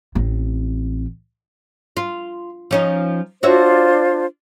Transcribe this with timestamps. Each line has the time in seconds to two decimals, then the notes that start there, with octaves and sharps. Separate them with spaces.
0.15 A1 C4
1.97 F4
2.71 F3 C#4 D#4
3.43 D4 F4 F#4 C5 C#5 E5